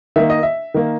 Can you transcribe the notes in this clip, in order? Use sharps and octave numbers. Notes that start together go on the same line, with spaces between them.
D#3 A#3 E5
D#5
E5
D#3 A#3